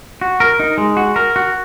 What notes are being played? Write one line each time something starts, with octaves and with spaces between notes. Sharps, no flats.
F#4
A#4
D#4
G#3
F#4
A#4
F#4